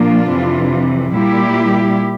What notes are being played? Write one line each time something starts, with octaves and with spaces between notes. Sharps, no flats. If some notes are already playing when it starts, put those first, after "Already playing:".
Already playing: A#2 F3 A#3 D4 F4
F2 C3 E3
A#2 G3 A#3 E4 G4